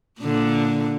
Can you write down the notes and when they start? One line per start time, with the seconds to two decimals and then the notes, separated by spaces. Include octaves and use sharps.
0.21 A#2 D3